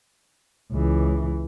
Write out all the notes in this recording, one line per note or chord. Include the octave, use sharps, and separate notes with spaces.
C#2 E3